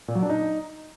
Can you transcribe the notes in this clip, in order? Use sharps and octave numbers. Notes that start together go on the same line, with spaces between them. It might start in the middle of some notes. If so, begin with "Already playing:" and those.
A#2
F#3
D4
D#4